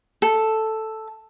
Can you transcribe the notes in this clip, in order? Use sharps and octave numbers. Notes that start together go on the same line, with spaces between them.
A4